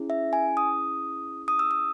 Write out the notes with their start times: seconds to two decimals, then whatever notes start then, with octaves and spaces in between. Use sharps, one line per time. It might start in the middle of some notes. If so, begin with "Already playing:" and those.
Already playing: C#4 E4 G#4
0.10 E5
0.33 G#5
0.57 D#6
1.48 D#6
1.59 E6
1.71 D#6